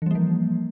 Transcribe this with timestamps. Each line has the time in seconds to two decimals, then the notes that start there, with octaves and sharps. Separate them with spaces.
0.02 E3
0.06 G3
0.11 A#3
0.15 F3